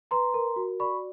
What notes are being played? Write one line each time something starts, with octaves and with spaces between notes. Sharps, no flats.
B4 A#5 C6
A#4
F#4
D5 B5 C#6